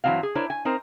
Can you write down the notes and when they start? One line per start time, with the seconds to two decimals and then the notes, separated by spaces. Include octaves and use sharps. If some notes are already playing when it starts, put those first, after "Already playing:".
0.04 G2 E3 F#3 G#3 C4 F5
0.23 G#4
0.35 D4 E4 A#4 C5 C#5
0.50 G#5
0.65 C4 D#4 A#4 C5